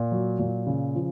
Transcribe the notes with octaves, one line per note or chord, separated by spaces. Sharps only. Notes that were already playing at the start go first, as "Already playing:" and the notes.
Already playing: A#2
F#3
A#2
C#3
F3